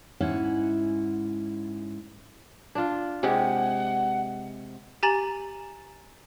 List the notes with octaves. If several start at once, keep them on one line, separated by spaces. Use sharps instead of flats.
G#2 C#4 E4 F#5
D4 F4
C3 G#3 G4 F#5
G4 G#5 A#5 A6 E7 F#7